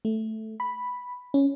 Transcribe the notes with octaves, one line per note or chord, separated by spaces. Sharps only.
A3
B5
C#4